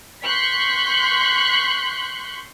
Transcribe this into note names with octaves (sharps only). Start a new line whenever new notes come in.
C6 C#6 F#6 G6 B6